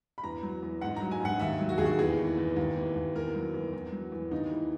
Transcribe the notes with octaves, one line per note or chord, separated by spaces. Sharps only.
B5
E2 A#5
F#3
E2
G#2 F#5
A#5
F#3
G#5
G#2 F#5
D#2 E5
F#3
F#4
D#2 G#4
F#4
E2 G#4
E3
E2
D#2
E3
D#2
E2 A#4
F#3
E2
E2
F#3
E2
D#2 D#4
E3